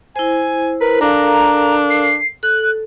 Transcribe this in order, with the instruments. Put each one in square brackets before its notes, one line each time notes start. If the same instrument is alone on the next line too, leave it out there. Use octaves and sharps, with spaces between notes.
[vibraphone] E4 C5 [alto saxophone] G#5
[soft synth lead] A#4 [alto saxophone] B4
[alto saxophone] D4 [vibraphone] A4 A#4 F5 [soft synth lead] A#5
[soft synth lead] C7
[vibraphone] A4 [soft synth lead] F#6